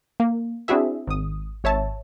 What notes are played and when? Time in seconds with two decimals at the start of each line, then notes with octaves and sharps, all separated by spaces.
0.20 A#3
0.68 C4 D4 E4 F#4 G#4 E5
1.07 G#1 D#6
1.64 G#1 C#5 E5 A5